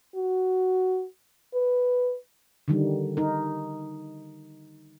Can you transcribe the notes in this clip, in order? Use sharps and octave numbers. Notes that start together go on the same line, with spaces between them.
F#4
B4
D3 D#3 G3
D#4 A#4